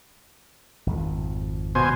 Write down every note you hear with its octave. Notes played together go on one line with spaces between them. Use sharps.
G#1 F2
B2 C5 G#5